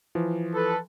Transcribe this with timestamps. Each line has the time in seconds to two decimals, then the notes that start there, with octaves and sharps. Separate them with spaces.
0.15 E3 F3
0.54 A4 B4